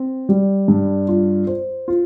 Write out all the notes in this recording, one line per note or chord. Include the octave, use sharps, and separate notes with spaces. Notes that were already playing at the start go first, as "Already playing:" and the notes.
Already playing: C4
G3
G2
F4
C5
F4